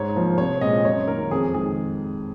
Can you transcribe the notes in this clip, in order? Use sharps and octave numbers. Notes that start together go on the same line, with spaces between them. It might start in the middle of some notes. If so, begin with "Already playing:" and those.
Already playing: G#2 C#5
F3 A#3
C2 C#5
A#2 G#3 C4 D#5
F#2 C#5
D#3 A#3 A#4
F2 G#4
D#3 G#3 G#4